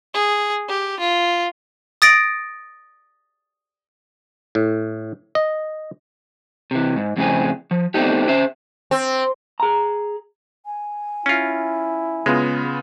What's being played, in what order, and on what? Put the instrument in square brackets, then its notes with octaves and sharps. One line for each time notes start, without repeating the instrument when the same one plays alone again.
[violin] G#4
G4
F4
[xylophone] D#6 A6 A#6 D7
[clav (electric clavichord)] A2
D#5
[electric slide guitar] C3 E3
G#2
F2 A2 C#3 C4 G#4
F3
A3 B3 C4 D4 D#4 G4
C#4 C5 E5
[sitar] C4
[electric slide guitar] G#4 A#5
[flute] G#5
[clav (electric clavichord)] C#4 F4 [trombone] E4
[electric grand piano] C#3 B3 F4 [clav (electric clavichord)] G#3